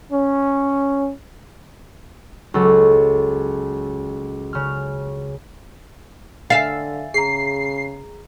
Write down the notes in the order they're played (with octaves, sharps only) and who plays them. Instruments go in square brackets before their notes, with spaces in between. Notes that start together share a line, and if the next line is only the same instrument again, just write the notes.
[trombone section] C#4
[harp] C#2 F#3 A4
C#3 F6
[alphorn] D3 [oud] E5 F5 [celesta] G#5 A6
[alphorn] C#3 [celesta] G#4 A#5 [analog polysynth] C7